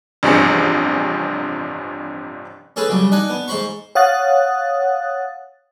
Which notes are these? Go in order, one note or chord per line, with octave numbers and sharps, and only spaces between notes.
A1 G2 C3 F3 G#4 C#7
C#4 G#4 A4 B4
C#3 F#3 G3
D4 D#4 F#5 G#5
B3
G#2 C5 B5 C#6
C#5 F5 F#5 D#6 F#6 A6